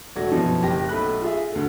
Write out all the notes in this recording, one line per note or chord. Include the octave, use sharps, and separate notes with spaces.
E1 A3 F#4 D5 G#6 A#6
F#2 B2 E3 F3
F#1 G4 G5 A#6
B1 A3 B5 F#6
F4 G#4 E5
D2 A3